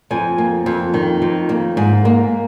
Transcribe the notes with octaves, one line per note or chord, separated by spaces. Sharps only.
F2 G#5
A#3
F2
D#3
F2
A#3
G#2
A#3